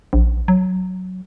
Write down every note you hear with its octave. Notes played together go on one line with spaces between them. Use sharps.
A#1
F#3